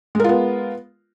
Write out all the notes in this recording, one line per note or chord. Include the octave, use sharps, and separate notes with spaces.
G#3 B3 F4 A#4